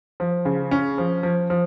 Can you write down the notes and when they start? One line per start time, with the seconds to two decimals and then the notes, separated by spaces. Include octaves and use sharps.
0.20 F3
0.45 C#3
0.71 C#4
0.98 F3
1.23 F3
1.50 F3